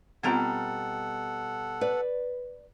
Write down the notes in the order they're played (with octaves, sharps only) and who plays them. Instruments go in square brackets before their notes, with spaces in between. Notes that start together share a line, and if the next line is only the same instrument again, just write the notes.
[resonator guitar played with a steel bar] B2 G3 A#5 [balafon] B3 C4 F4 [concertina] A4 F#5
[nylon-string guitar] B4 D5